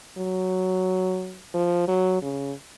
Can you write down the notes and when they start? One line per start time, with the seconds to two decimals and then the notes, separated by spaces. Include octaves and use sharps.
0.18 F#3
1.54 F3
1.88 F#3
2.22 C#3